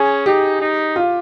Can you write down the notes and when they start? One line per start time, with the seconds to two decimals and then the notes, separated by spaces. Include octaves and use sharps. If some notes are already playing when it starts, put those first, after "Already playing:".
Already playing: C#4 G#4
0.26 D#4 G4
0.61 D#4
0.96 F4